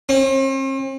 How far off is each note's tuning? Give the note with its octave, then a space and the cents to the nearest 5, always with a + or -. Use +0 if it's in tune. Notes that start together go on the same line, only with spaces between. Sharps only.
C4 +45